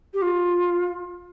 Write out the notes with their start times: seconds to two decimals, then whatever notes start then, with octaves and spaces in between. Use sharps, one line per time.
0.13 G4
0.21 F4